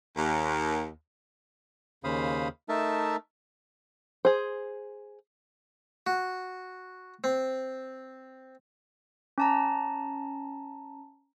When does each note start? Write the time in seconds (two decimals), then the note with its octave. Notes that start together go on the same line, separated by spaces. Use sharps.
0.17 D#2
2.04 D#2 C#3 C5 F5 B5 D#6
2.69 A3 D#4 A#4 E5 A5
4.25 G#4 C5
6.07 F#4
7.24 C4
9.38 C#4 A5 A#5